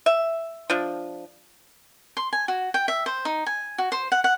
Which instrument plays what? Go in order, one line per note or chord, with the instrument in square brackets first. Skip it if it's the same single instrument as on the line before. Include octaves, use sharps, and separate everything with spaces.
[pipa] E5
F3 D4
[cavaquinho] C6
G#5
F#4
G5
E5
C5
D#4
G#5
F#4
C5
F#5
F#5